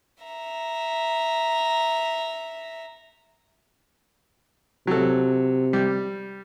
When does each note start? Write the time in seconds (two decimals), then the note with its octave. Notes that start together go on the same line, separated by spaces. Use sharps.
0.24 E5 A#5
4.87 C3 F#3 A4
5.73 G3